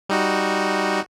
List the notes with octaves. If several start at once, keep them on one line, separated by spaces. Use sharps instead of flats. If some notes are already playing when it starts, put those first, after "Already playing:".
G3 D#4 F#4